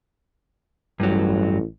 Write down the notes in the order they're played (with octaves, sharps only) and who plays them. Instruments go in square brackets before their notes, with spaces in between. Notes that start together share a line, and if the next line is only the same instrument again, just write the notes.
[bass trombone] A1 [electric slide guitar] G2 F#3